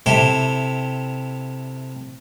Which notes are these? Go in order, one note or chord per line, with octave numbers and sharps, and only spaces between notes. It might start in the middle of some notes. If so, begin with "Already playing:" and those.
C3 E4 G4 A4 C5